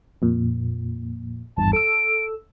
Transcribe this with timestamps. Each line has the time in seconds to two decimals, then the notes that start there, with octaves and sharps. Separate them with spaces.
0.22 F2 A#2
1.57 G#1 E2 G2 A5
1.73 A4 E6 D7